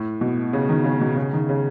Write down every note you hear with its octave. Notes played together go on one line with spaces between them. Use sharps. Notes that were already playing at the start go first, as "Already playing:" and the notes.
Already playing: A2
B2
C#3
D#3
C#3
B2
C#3
D#3
C#3